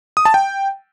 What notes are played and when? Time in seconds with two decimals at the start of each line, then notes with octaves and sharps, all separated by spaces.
0.17 D#6
0.25 A5
0.34 G5